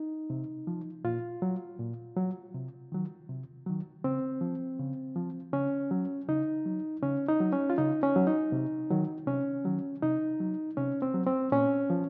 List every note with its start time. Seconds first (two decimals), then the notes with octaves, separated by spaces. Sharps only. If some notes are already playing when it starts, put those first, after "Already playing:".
Already playing: D#4
0.30 C3
0.67 F3
1.04 A#2 F4
1.42 F#3
1.79 A#2
2.17 F#3
2.54 C3
2.92 D#3 F#3
3.29 C3
3.66 D#3 F#3
4.04 C#3 C4
4.41 F3
4.79 C#3
5.16 F3
5.53 C#3 C#4
5.91 F#3
6.29 C#3 D#4
6.65 F#3
7.03 C#3 C#4
7.29 D#4
7.40 F#3
7.53 C#4
7.70 F4
7.78 C#3 D#4
8.03 C#4
8.16 F#3
8.27 D#4
8.52 C3
8.90 D#3 F#3
9.27 C3 C#4
9.64 D#3 F#3
10.02 C3 D#4
10.40 F#3
10.77 C3 C#4
11.02 C4
11.14 F#3
11.26 C4
11.52 A#2 C#4
11.90 F3